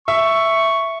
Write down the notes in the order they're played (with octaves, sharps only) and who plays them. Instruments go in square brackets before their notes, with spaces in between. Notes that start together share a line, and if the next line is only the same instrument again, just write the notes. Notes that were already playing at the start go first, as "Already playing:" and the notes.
[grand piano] E5 [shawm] C#6